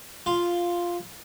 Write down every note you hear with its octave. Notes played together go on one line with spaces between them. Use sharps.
F4